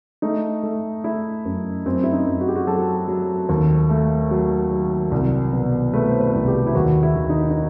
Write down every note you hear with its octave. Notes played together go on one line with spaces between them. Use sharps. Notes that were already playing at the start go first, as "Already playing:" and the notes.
A3 D#4
A3
A3 E4
F#2
F#2 C4
E4
D#4
F#2
F#4
G4
F#4
F#3 A4
F#3
D#2
A3
F#3
F#3
C2
B2
A3 B4
C5
B4
C2
G4
E4
D#2 F#4
E4
D#3
D#4
D#4